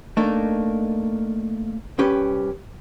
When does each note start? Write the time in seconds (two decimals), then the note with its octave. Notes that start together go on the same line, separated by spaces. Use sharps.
0.17 A3 A#3 D4 D#4
1.98 C2 C#4 G4 B4